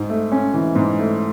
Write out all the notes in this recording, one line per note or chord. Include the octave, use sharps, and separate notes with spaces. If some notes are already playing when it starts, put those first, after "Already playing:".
Already playing: G#2
A3
C#4
E3
G#2
A3